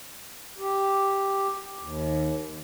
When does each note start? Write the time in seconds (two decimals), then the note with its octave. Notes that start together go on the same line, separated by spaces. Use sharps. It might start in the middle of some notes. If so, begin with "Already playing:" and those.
0.58 G4
1.79 D#2